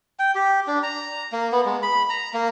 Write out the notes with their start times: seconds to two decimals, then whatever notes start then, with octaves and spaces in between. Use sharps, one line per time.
0.19 G5
0.35 G4
0.67 D4
0.83 A#5
1.32 A#3
1.52 B3
1.65 G#3
1.83 B5
2.10 A#5
2.34 A#3